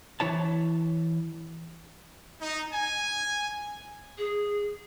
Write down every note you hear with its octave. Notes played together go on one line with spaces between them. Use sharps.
E3 E4 C#5 A5
D#4
G#5
G#4